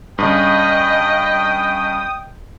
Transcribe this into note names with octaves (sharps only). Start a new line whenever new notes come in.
G2 C#3 D#5 G5 D#6